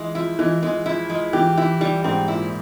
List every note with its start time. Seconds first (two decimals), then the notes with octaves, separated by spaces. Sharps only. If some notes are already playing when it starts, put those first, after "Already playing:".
Already playing: E3 G#3
0.15 F3 E4
0.39 E3 G#3
0.63 E3 G#3
0.86 F3 E4
1.09 F3 G#3
1.33 E3 G4
1.58 E3 E4
1.81 E3 G3
2.04 G#2 C4
2.28 A#2 E4